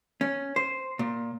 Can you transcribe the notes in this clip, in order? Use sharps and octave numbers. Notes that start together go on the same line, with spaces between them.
C#4
C5
A#2